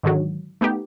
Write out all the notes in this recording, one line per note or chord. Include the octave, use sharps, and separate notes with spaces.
G#2 D3 D#3 F#3
A3 B3 D#4 G4